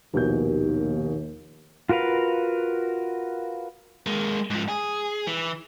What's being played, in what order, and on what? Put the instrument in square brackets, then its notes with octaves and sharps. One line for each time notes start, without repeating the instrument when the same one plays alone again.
[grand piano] A#1 B2 G6 [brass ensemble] D#2
[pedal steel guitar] F4 F#4 A#4 B4 F5
[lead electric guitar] G#3 A#3
G#2 F3
G#4
E3